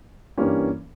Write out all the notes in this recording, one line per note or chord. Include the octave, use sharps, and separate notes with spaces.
G2 E3 G3 A#3 C#4